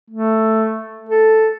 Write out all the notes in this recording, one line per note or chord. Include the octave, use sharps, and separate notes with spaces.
A3
A4